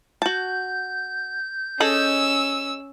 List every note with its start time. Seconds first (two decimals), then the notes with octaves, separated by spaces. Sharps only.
0.22 F#4 A5 G6
1.80 C#4 G#4 A4 D#5 E6